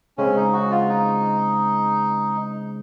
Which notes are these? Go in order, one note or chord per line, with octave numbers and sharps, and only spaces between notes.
C#3 G#3 C4 C#4
D#4
F#4
F4
D#4